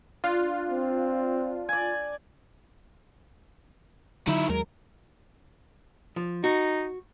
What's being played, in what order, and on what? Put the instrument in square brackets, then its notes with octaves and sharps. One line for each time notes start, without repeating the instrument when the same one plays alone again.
[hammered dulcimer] D4 [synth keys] F4
[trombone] C4
[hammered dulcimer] D5 G#5
[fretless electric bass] D3 F#3 [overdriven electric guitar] D#3 E4
[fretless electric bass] D#2 F#3 G#3 [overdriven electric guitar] A#4
[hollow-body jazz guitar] F3
[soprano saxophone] D#4 [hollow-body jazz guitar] F#4